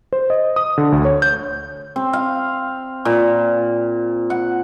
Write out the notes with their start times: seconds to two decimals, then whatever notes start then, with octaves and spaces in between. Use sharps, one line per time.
0.13 C5
0.30 D#5
0.56 D#6
0.78 D3
0.92 D2
1.05 C#5
1.22 G6
1.96 C4
2.13 F5
3.05 A#2
4.30 F#5